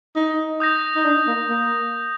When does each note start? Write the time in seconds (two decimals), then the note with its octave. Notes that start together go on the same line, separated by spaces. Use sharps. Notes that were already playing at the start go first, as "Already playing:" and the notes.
0.16 D#4
0.60 D#6 G6 A#6
0.96 D#4
1.05 D4
1.27 A#3
1.49 A#3